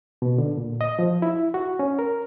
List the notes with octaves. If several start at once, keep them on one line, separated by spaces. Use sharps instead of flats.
B2
D3
A#2
D#5
F3
E4
F#4
C#4
A#4